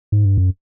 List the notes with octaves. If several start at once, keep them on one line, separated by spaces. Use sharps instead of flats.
G#2
G2
F#2